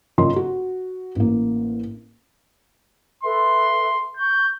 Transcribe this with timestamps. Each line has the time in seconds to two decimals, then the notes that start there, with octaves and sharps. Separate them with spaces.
0.18 F#1 F#2 C#3 F4 D#5 C6
0.36 F#4
1.16 A1 A#3
3.23 A4 B4 E5 C6
4.17 C#6 G6